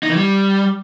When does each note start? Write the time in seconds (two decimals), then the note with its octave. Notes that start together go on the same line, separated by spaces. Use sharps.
0.03 D#4
0.10 E3
0.16 G3